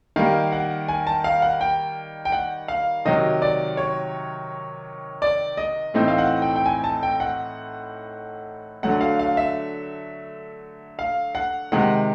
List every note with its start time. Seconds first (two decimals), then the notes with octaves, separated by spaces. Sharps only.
0.16 D#3 G3 A#3 F5
0.52 F#5
0.88 G#5
1.07 A5
1.24 F5
1.42 F#5
1.61 G5
2.25 G5
2.32 F#5
2.68 F5
3.05 C3 D#3 F#3 D#5
3.42 D5
3.77 C#5
5.22 D5
5.57 D#5
5.94 A2 E3 A3 C4 D#4
6.08 F5
6.18 F#5
6.42 G5
6.56 G5
6.66 G#5
6.84 A5
7.03 G5
7.20 F#5
8.83 D3 F#3 A3 F#5
9.01 F5
9.19 F5
9.37 E5
10.99 F5
11.35 F#5
11.72 C3 D#3 G#3 F#5